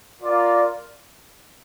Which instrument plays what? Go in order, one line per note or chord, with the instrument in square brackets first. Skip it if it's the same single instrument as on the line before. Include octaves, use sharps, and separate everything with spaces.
[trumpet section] F4 A#4 D5 F5